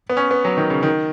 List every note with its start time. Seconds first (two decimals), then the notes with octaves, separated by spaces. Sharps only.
0.09 B3
0.17 C#4
0.31 B3
0.45 F#3
0.57 D#3
0.70 C#3
0.83 D#3